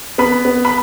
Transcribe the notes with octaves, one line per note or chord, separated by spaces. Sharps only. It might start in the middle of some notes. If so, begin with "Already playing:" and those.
B3 B5
B3
B5